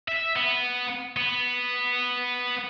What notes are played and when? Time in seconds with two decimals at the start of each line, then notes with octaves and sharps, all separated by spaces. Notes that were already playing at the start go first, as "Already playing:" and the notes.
0.08 E5
0.36 B3
1.16 B3